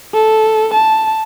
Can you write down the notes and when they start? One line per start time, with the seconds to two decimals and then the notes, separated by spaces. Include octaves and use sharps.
0.14 A4
0.73 A5